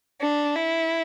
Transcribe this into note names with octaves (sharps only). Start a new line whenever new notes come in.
D4
E4